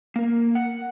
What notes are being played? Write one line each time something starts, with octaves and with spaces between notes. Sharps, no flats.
A#3 A#4
F#5